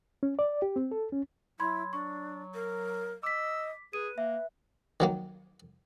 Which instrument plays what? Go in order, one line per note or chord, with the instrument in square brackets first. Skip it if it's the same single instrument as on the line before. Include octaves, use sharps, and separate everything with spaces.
[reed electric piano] C#4
D5
G4
C4
A4
C#4
[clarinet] F#3 [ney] E4 [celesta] B5 C6 G#6
[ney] D4 [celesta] C#6
[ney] A#4
[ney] D#5 [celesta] D6 B6 [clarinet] E6
[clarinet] G#4 [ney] B4 [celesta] D#7
[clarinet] A#3 [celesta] E5
[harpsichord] D#3 F#3 A#3